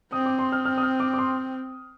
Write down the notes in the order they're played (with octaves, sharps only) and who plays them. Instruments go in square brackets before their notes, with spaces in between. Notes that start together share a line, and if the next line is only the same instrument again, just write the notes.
[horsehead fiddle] C4 [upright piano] D#6
[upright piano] D6
C6
F6
F6
D#6
F6
D6
D6
C6